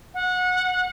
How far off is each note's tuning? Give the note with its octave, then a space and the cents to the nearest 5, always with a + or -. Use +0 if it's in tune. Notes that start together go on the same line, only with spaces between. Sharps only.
F#5 -25